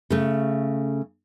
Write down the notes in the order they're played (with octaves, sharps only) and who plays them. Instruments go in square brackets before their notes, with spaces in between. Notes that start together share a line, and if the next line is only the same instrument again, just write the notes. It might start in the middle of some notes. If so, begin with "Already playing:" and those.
[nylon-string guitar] C#3 A3